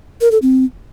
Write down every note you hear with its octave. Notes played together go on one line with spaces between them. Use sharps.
A#4
A4
C4